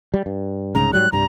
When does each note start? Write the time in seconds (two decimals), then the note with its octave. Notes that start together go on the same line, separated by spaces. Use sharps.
0.14 G3
0.26 G2
0.75 C2 G#2 C#3 A#5
0.93 G#2 F#3 G3 F#6
1.12 C2 G2 G3 A#5